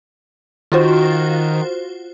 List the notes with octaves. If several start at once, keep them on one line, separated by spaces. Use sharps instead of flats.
D#3 F4 F#4 C5